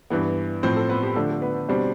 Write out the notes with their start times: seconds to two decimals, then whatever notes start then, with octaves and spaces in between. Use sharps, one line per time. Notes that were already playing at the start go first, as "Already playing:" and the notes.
0.10 G2 E3 B3
0.63 A2 F3 C4 C5
0.76 A4
0.89 B3 B4
1.03 G4
1.16 D3 F3 A3 D4 A4
1.31 A4
1.42 B3 B4
1.69 B2 G3 C4 D4 C5